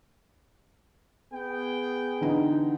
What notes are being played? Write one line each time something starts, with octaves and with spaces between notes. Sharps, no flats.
B3 G#4 G5
D3 E3 D#4